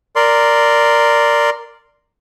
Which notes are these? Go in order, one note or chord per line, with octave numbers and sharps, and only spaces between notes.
A#4 D5 C6